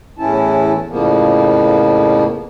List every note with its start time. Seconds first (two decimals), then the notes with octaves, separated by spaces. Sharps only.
0.18 E2 A2 E3 C#4 E4 A5
0.90 F2 A2 C#3 F3 A#3 B3